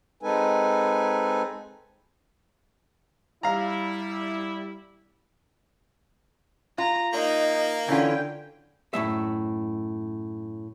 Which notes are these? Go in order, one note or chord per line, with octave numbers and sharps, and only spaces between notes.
G#3 C4 D#4 A4 B4 G#5
G3 E4 F5 A#5
F4 A#5
A#3 D#4
D3 E3 C#4 F4 G5
F#2 A2 G#3 E5